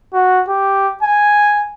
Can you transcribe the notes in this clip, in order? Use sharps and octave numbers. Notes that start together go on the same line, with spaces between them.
F#4
G4
G#5